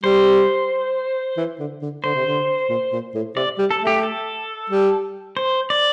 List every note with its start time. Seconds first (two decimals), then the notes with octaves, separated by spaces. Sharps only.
0.03 G3 C5
1.37 E3
1.60 D3
1.82 D3
2.04 D3 C5
2.15 C3
2.26 D3
2.70 A#2
2.93 A#2
3.15 A2
3.36 C3 D5
3.59 G3
3.71 A4
3.81 A3
3.87 G4
4.03 A4
4.70 G3
5.37 C5
5.70 D5